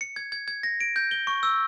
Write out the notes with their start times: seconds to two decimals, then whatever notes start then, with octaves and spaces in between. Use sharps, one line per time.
0.01 C#7
0.16 G#6
0.32 G#6
0.48 G#6
0.63 A#6
0.80 D7
0.96 G6
1.11 G7
1.27 C#6
1.43 E6